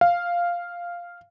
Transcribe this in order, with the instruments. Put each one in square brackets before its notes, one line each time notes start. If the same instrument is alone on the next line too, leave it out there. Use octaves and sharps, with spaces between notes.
[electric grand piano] F5